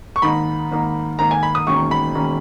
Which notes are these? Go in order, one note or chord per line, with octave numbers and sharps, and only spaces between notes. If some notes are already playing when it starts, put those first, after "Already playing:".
C#6
G#2 D#3 A#3 D#4 B5
G#2 D#3 A#3 D#4
G#2 D#3 A#3 D#4 A#5
G#5
B5
D#6
E1 D#2 D#3 A#3 C#4 C#6
B5
E1 D#3 A#3 C#4